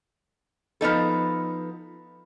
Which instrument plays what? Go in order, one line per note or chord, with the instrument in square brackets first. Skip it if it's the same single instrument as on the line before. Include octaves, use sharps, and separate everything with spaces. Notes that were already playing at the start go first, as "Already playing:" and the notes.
[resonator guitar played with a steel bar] F3 B3 D#4 A4